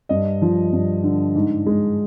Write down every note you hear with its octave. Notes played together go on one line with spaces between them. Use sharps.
G2 D#5
F3
G2
D3
G#2
G#3